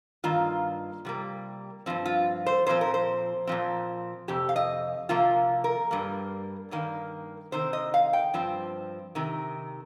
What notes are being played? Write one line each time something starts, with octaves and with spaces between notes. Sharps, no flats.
G2 D#3 A#3 F4
C3 G3 A#3
G2 F3 C4
F4
C5
A#2 F3 C4 C5
A#4
C5
A#2 F3 C4
F2 C3 G4
F5
D#5
C3 F3 A#3 F4
A#4
G2 G3 A#3
G2 D#3 A#3
C3 D#3 C4 C5
D#5
F5
G5
G2 F3 C4
C3 D#3